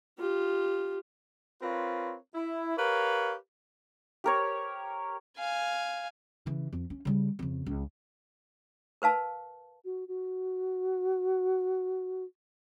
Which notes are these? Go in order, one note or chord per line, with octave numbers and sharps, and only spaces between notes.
F4 G4
C4 F4 A#4 B4 C#5
E4
G4 A#4 B4 C#5 F5
G4 A#4 C#5
F5 G#5
C#3 E3
F2
C#4
C#3 G3
F2 C#3
C#2
A#4 B4 F5 A5
F#4
F#4